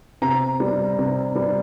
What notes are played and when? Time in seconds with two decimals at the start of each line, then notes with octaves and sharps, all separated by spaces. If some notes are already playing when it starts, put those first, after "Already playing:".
0.22 C3 A#5
0.60 G3
0.99 C3
1.35 G3